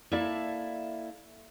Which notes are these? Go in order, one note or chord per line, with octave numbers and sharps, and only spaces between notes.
A#3 E4 A4 D5 E5 A5